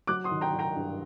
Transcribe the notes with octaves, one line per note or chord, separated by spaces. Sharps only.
F#3 D6 F#6
C6 D#6
D#3
G5 A#5
F#3
G5 A#5
G2